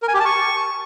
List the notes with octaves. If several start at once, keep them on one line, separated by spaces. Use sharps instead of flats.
A#4
G#5
G4
A5
C#6